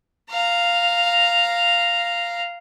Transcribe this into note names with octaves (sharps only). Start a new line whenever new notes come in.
F5 A#5